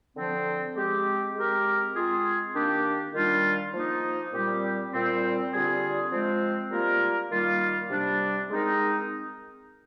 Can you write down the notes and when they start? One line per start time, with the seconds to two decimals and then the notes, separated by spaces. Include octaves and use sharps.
0.16 D3 F3 C4
0.76 G#3 C4 G4
1.36 G#3 C4 G4 A#4
1.95 G#3 C4 F4 G#4
2.55 D#3 A#3 D4 G4
3.14 D#3 G3 D4 F4
3.74 F3 A#3 D#4
4.33 A#2 G3 C4 G4
4.92 A#2 G3 C4
5.52 D3 G3 C4 F4 G#4
6.12 F3 G#3 C4
6.71 G3 A#3 F4 A#4
7.31 D#3 G3 A#3 F4
7.90 C3 G3 D4
8.50 G#3 C4 D#4 A#4